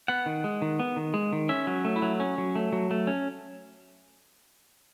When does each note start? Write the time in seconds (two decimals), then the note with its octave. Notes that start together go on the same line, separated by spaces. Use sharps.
0.08 B3 F#5
0.26 D#3
0.44 G#3
0.62 D#3
0.79 B3
0.97 D#3
1.14 G#3
1.33 D#3
1.49 C#4 E5
1.67 F#3
1.85 A3
1.96 E4
2.02 F#3
2.20 C#4
2.38 F#3
2.55 A3
2.73 F#3
2.91 A3
3.07 C#4